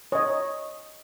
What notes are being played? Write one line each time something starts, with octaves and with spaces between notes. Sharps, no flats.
C#5 D#5